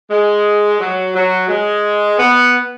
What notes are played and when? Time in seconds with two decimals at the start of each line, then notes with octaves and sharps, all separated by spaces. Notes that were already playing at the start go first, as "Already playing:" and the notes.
0.11 G#3
0.80 F#3
1.15 F#3
1.49 G#3
2.19 B3